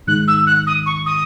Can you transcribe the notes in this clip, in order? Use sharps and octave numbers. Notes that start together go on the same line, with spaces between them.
G#2 D#3 G#3 D#4 F#6
E6
F#6
D#6
C#6
D#6